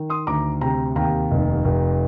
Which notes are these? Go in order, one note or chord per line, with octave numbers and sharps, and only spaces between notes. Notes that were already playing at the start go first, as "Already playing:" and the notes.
Already playing: D#3
C6 D#6
D2 A#5 D6
C3 G5 A#5
D#2 G5 A#5
F1
F1